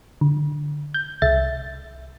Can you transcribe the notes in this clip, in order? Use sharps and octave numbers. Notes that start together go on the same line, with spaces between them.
D3
G6
C2 E5 A6